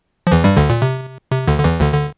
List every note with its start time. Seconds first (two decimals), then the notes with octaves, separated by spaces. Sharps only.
0.27 F3
0.32 E2 E3
0.44 G2 G3
0.57 D2 D3
0.70 A#2
0.82 C3
1.31 C3
1.48 D2 D3
1.59 D3
1.64 E2 E3
1.81 D2 D3
1.94 D3